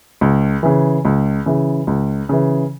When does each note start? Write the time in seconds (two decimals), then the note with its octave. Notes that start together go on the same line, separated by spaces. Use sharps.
0.21 C#2
0.63 C#3 E3
1.05 C#2
1.46 C#3 E3
1.87 C#2
2.29 C#3 E3